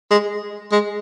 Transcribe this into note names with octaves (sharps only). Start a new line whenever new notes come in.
G#3
G#3